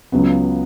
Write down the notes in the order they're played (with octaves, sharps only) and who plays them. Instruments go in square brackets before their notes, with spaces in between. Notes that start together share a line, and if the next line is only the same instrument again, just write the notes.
[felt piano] C#2 C#3 F#3 B3